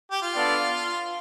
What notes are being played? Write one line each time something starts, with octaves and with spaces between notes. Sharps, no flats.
G4
F4
B3 D4 A4 D5 F5